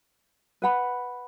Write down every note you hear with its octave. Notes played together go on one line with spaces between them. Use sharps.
B4 F#5 B5